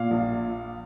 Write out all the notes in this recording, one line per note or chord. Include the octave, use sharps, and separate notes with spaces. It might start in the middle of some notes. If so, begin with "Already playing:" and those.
Already playing: A#2 F5
A#1